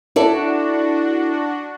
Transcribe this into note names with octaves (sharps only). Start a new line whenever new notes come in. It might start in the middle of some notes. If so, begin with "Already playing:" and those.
D4 E4 F#4 A4 D5